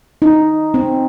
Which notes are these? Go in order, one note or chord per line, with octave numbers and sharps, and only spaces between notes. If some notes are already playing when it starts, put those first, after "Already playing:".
D#4
C4